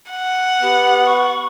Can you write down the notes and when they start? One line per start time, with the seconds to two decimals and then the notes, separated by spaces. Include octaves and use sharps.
0.10 F#5
0.62 B3 G4
1.06 C#6